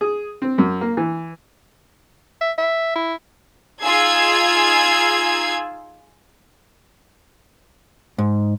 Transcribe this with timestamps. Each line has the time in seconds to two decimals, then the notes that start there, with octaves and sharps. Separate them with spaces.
0.01 G#4
0.42 C4
0.58 F#2
0.81 A#3
0.97 E3
2.41 E5
2.58 E5
2.95 E4
3.83 D#4 F4 G#4 E6 G#6 C7
8.18 G#2